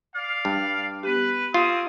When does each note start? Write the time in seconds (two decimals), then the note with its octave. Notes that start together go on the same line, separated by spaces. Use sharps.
0.14 D5 F5
0.45 G2
1.03 B3 G4 B4
1.54 C4 C#4 F4 D#6